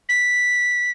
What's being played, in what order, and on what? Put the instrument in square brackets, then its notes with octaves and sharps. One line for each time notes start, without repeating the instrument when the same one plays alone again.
[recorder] B6